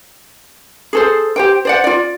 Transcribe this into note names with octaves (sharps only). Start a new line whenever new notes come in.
G#4 A4 C5
G4 C5 G5
C5 D5 F#5
F4 D5